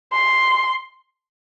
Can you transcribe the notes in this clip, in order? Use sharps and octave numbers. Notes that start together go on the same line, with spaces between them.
C6